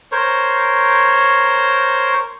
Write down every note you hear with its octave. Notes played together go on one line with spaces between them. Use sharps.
A#4 C5 C#5